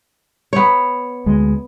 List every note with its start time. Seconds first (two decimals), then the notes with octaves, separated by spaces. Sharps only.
0.53 B3 C#5
1.26 D2 G#3